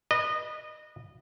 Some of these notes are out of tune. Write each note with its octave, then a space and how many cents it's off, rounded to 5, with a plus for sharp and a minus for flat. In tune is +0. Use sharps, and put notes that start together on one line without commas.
B4 -20 D#5 -25